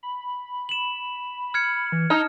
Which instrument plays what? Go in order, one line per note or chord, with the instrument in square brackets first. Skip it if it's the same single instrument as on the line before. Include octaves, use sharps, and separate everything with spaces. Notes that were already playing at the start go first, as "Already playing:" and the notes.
[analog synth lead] B5
[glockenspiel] E7 F#7
F6 G#6 C#7
[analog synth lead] E3
[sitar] D#4 [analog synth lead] A5 [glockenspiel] F6